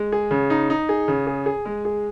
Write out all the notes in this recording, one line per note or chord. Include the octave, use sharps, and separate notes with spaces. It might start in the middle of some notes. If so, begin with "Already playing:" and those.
Already playing: G#3
G#4
C#3
D#4
D#4
G#4
C#3
G#4
G#4
G#3
G#4